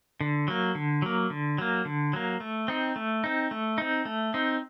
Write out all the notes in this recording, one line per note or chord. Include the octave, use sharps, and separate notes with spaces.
D3
F#3 A#3
D3
F#3 A#3
D3
F#3 A#3
D3
F#3 A#3
A3
C4 D#4
A3
C4 D#4
A3
C4 D#4
A3
C4 D#4